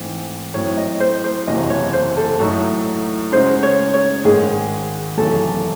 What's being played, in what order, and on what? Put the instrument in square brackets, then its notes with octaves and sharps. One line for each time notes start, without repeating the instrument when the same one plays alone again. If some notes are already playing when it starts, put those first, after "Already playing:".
Already playing: [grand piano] G#2 E3 A3 C4
[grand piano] A2 F#3 C4 [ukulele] C#5
[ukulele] D#5
C5
C5
[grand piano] F#1 E2 C3 F#3 [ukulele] D#5
[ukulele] C#5
C5
A4
[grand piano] A2 F#3 A3 D#4 [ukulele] F#4
[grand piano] C#3 G#3 D#4 F#4 [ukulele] C5
[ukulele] C#5
C#5
[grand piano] G#1 G#2 D#3 G#3 [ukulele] G#4
[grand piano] F#1 E2 C3 F#3 [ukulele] A4